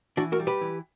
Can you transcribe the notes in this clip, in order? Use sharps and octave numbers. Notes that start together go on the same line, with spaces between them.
E3 D4 F#4
F#4 A#4
G3
G4 B4
E3